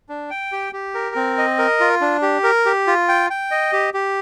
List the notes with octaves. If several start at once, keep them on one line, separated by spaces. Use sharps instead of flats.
D4
G5
G4
G4
A#4
C4
D#5
A#4
F4
D4
G4
A#4
G4
F4
G5
G5
D#5
G4
G4